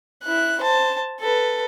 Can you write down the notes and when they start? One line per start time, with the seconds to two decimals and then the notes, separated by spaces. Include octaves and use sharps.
0.23 E4 F#6
0.60 C5 A5
1.20 A4 B4